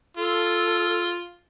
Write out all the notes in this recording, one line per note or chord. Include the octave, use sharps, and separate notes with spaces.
F4 A4